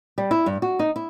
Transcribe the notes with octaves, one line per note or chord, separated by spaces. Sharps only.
G3
E4
G2
F#4
D#4
E4